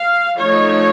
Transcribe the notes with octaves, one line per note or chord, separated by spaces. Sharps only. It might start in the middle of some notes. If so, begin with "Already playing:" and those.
Already playing: F5
F3 A3 D#4 C#5